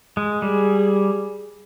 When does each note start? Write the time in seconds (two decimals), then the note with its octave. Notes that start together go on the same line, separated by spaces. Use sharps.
0.17 G#3
0.42 G3 G#4